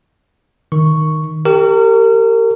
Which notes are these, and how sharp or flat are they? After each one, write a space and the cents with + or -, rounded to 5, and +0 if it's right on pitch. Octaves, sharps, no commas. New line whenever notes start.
D#3 +0 C#6 +0
G4 +0 A#4 -30 C#6 +40